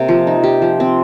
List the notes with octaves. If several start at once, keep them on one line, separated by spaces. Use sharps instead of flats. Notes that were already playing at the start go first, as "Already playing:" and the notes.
Already playing: C3 A#3
F3
D#4
G4
F3
C4